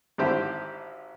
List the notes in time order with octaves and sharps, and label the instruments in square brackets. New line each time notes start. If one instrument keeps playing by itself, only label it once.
[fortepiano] G#1 D3 E4 G4 C5